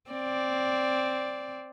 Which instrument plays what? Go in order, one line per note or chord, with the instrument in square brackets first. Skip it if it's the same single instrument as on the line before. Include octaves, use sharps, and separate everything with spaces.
[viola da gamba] C4 D5